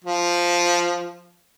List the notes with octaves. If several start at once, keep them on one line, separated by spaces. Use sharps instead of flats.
F3